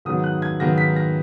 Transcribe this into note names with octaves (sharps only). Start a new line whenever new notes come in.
G#2 D#3 F#3 B3 D#6
F#6
G#6
G#2 D#3 F#3 B3 A#6
B6
A#6